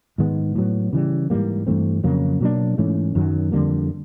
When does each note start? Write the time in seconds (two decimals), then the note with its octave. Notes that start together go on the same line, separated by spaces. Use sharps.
0.18 G#2 D#3 G#3 B3
0.55 A2 F#3 B3
0.93 C#3 E3 G3
1.30 G#2 E3 G3 A#3
1.67 G2 E3 A3 C4
2.04 F2 C#3 F#3 A#3
2.41 B2 F#3 A#3 D4
2.78 G#2 E3 A3 C#4
3.15 F#2 D#3 F#3
3.52 F2 D3 G3 A#3